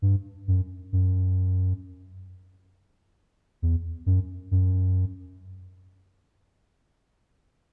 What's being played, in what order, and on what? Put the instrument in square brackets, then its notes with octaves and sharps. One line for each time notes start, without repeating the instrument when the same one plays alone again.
[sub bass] G2
F#2
F#2
E2
F#2
F#2